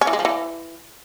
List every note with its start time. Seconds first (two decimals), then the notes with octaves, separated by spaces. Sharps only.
0.01 C#4
0.07 E3
0.13 G#3
0.19 F3
0.25 E3